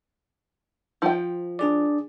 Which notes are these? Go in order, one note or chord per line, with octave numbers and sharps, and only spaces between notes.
F3 G5
D4 G#4 D5